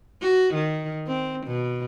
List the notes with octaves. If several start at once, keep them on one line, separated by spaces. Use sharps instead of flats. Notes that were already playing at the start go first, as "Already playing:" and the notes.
F#4
D#3
C4
B2